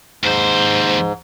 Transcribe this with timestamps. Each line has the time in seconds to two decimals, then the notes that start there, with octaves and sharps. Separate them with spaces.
0.24 D#2 G#2 C5